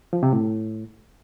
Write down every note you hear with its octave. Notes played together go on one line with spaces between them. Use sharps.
F3
C3
A2